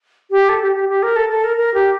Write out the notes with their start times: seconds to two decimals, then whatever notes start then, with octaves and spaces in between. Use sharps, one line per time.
0.30 G4
0.49 A4
0.61 G4
0.75 G4
0.88 G4
1.02 A#4
1.16 A4
1.29 A4
1.43 A#4
1.57 A#4
1.74 G4